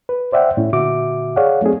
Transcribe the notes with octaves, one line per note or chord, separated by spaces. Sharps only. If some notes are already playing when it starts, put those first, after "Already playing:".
B4
C5 D5 E5 F#5 G5
A2 C#4 E4
A#2 D3 F#4 E5 D6
G#4 C#5 D5 F5 F#5
F#3 A3 C4 D#4 G#4